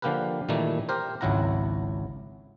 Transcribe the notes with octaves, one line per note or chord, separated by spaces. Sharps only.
D3 F3 A#3 G4 A#4 B4
A#2 D#3 E3 G3 A3 A#3
G4 A#4 C5
G#1 C#2 F#3 E4 F#5 A#5